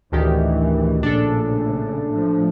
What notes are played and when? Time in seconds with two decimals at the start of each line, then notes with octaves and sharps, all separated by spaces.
0.12 A1 D2 D#3 E3 G4
1.03 A#1 A2 C#3 D4 A4
2.08 A2 F3